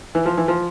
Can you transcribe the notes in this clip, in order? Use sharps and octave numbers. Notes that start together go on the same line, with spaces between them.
E3
F3
E3
F3